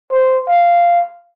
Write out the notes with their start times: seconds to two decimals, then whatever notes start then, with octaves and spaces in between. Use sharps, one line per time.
0.11 C5
0.48 F5